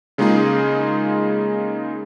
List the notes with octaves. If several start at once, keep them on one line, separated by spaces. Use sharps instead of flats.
C#3 G#3 A#3 D#4 F4 G#4